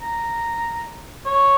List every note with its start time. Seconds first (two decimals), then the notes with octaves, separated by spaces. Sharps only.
0.01 A#5
1.26 C#5